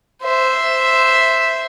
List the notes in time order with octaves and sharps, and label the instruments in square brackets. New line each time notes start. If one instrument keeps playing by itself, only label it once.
[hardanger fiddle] C5 E5